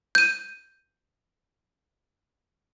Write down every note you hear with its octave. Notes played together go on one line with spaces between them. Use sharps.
G6 D#7